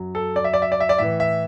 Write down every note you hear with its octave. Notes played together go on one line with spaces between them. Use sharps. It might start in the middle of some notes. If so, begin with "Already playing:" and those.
Already playing: F#2 F#3
A4
D5
E5
D5
E5
D5
E5
D5
A2 E3 E5
E5